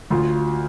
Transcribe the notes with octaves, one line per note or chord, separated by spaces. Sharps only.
D2 F4